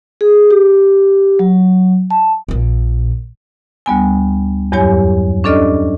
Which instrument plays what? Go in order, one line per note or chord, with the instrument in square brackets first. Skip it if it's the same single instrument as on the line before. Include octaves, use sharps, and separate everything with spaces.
[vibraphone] G#4
G4
F#3
A5
[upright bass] A#1 A#2
[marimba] D2 G3 B3 G#5
E2 G2 F#3 G4 C#5 G#5
C#4 D4 A4 D5 D#5 F6